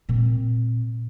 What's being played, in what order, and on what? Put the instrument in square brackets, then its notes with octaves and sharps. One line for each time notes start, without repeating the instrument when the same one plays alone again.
[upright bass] A#2 C4